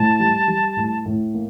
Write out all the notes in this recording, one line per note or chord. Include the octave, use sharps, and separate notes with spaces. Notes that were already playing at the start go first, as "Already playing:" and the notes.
Already playing: A2 A5
G3
G3
A2
A2
A#3